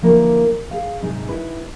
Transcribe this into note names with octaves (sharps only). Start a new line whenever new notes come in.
D3 F3 A#3 E4 G4 A#4
G#4 F5
G#2 C3 G#3 D#4
D#4 E4 B4